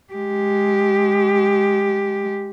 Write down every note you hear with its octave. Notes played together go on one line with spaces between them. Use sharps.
G#3 G4